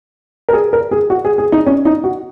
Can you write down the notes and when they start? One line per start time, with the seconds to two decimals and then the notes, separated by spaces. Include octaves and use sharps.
0.49 A#4
0.53 G#4
0.73 A#4
0.91 G#4
1.10 F#4
1.25 G#4
1.38 G#4
1.52 D#4
1.66 C#4
1.85 D#4
2.04 F#4